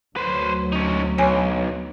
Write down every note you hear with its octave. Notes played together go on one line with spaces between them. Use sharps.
D2 F#3 B4 C5
C#4 D#4
B1 C#5 G#5